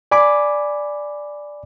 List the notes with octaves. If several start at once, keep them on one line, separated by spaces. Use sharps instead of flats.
D5 G#5 B5 D6